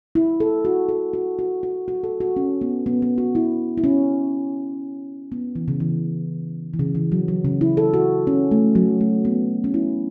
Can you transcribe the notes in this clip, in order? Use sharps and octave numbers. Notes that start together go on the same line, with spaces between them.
E4
A4
F#4
A4
F#4
F#4
F#4
F#4
A4
F#4
C#4
B3
B3
B3
F#4
E4
E4
C#4
B3
E3
C#3
E3
E3
C#3
E3
F#3
F#3
C#3
E4
A4
F#4
C#4
A3
F#3
A3
B3
C#4
E4